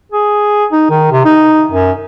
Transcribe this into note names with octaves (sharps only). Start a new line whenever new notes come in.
G#4
D#4
D#3
C3
D#4
F#2